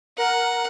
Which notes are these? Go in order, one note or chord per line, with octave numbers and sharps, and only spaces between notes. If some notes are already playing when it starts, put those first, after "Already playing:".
A#4 F#5